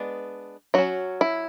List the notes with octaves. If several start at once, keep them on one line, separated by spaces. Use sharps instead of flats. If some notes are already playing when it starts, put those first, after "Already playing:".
Already playing: G#3 B3 D4
F#3 C#4 F#4
E4